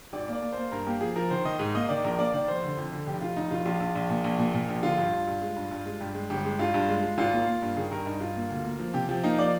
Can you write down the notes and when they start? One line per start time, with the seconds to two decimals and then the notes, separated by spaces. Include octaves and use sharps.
0.13 G#1 D5
0.28 A#3 D5
0.42 A#3
0.53 A#3 C5
0.72 G2 A#4
0.87 A#3 G4
1.01 F3 G#4
1.16 F3 A#4
1.30 D#3 C5
1.45 D#3 D#5
1.59 G#2
1.75 A#3 D#5
1.89 D#3 D5
2.04 A#1 A#4
2.19 A#3 D5
2.33 D#3 D5
2.48 F1 C5
2.63 D3
2.77 F2
2.92 D3
3.07 F1 G4
3.21 F1 F4
3.36 F1 D#4
3.51 F1 F4
3.65 A#1 F4
3.80 A#1
3.95 A#1
4.10 A#2
4.24 A#1
4.39 A#2
4.54 A#2
4.68 A#1
4.83 D3 F4
4.98 G2
5.12 G2
5.27 G2
5.42 G#3
5.56 G2
5.71 G2
5.86 G#3
6.00 G2 G4
6.15 G#3
6.30 G1 G4
6.45 G#3
6.59 G2 F4
6.74 G2
6.88 G#3
7.03 G#3
7.18 G#1 F4
7.33 A#3
7.48 A#3
7.62 G2
7.77 D#3 G#4
7.91 G2 A#4
8.06 G2 D#4
8.20 G2 F4
8.36 A#3
8.50 D2
8.65 A#3
8.79 F3
8.94 C3 G4
9.09 F3 G4
9.23 A#3 D#4
9.38 F3 D5